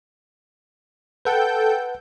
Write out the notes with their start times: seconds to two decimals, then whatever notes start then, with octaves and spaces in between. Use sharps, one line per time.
1.25 A4 B4 F#5 G5 G6